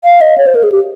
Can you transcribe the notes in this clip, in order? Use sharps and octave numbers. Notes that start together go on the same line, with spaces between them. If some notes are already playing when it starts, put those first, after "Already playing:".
F5
D#5
C#5
C5
A#4
G#4
G4